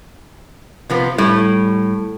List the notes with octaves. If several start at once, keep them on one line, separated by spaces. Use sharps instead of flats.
C3 F3 B3
A2 G3